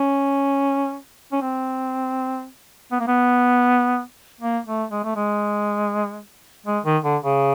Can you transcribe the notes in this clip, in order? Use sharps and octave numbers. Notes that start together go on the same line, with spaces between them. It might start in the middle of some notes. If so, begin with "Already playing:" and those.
Already playing: C#4
C#4
C4
B3
A#3
B3
A#3
A3
G#3
A3
G#3
G#3
D#3
D3
C#3